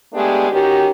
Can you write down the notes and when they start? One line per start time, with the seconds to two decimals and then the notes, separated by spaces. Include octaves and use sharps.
0.13 G#3 A3 B3 D4 G4 G#4
0.50 D#3 C#4 F#4 G4